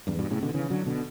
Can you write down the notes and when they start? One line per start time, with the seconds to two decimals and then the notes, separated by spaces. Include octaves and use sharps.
0.07 E2 G2
0.19 G2 B2
0.31 A2 C#3
0.42 B2 D3
0.54 C#3 E3
0.70 D3 F#3
0.86 B2 D3